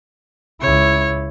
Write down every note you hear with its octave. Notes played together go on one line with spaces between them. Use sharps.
C#2 E4 C#5